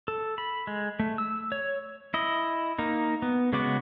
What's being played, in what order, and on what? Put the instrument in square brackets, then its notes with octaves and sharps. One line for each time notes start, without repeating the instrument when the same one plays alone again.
[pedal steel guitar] A4
B5
G#3
A3
E6
C#5
E4 D#5
A#3 D#4
B3
C#3 G#3 B3 F#4 D6